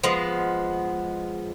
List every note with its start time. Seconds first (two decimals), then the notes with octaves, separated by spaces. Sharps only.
0.04 F3 G#3 B3